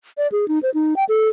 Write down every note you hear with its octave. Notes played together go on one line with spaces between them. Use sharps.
D5
G#4
D#4
C5
D#4
G5
A4